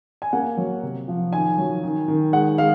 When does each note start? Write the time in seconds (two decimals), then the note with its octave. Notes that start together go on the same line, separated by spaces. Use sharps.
0.22 G#5
0.33 A#3 F#5
0.57 F#3
0.83 C3
1.08 F3
1.32 D#3 G#5
1.58 F#3
1.83 D#3
2.08 D#3
2.33 G#3 F#5
2.58 G#3 F5